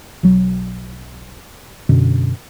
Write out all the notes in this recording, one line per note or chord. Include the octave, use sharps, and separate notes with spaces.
B1 F#3
F#2 B2 D3